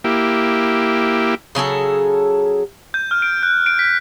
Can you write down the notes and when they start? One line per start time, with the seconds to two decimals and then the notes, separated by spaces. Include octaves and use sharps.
0.04 A#3 E4 G4
1.55 C#3 F#3 G#4 A4
2.94 G6
3.11 F6
3.22 D7
3.43 F#6
3.66 D7
3.79 B6